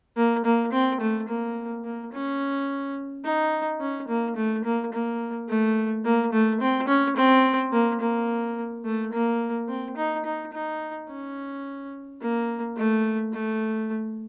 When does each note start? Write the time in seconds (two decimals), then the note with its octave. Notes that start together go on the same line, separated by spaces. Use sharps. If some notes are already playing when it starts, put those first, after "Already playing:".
0.17 A#3
0.45 A#3
0.73 C4
1.01 A3
1.28 A#3
1.84 A#3
2.13 C#4
3.25 D#4
3.80 C#4
4.08 A#3
4.36 A3
4.64 A#3
4.93 A#3
5.49 A3
6.05 A#3
6.33 A3
6.61 C4
6.88 C#4
7.17 C4
7.73 A#3
8.01 A#3
8.85 A3
9.13 A#3
9.69 C4
9.97 D#4
10.25 D#4
10.53 D#4
11.09 C#4
12.21 A#3
12.77 A3
13.33 A3